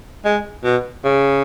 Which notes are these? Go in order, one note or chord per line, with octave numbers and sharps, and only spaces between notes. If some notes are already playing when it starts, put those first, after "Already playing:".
G#3
B2
C#3